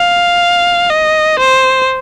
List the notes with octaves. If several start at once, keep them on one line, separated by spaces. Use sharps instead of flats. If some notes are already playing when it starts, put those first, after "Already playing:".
Already playing: F5
D#5
C5